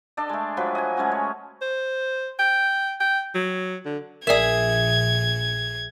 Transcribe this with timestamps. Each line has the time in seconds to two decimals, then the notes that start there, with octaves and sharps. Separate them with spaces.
0.17 D4 A4 D5 D#5
0.29 G#3 A3
0.57 F3 F#3 B4
0.75 D#5 G#5
0.97 G#3 A3 C#4 F#4
1.12 C#5
1.62 C5
2.39 G5
3.01 G5
3.35 F#3
3.85 D3
4.27 A#1 G#4 A#4 D5 E5 G#6